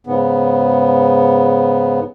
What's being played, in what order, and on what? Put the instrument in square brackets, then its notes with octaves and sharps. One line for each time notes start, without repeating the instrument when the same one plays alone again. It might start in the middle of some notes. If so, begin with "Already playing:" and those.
[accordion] G#2 C#3 B3